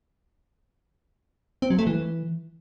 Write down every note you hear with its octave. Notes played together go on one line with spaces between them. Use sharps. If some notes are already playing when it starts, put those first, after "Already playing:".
C4
F#3
A3
E3